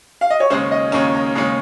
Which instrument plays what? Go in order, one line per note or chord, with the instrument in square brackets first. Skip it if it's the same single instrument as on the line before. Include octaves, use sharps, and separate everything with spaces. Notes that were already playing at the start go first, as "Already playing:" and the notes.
[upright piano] F5
D#5
C#5
[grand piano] D#2 C#3 G#3 C#4 [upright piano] C5
[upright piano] D#5
[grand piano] D#2 C#3 G#3 C#4 [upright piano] A#5
[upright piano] A#5
[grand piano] D#2 C#3 G#3 C#4